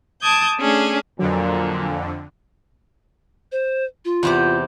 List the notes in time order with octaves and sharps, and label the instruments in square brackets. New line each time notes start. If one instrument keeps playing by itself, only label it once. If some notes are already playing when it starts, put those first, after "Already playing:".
[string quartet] A5 D6 D#6 G6 G#6
A3 C#4 D4 G#4
[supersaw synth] F2 D3 [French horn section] A#2 [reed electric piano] F#3
[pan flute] C5
F4
[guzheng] E2 C3 G4